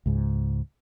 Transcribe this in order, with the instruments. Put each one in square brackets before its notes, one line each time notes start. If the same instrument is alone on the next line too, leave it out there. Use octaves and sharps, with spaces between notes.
[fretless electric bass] C#2 G#2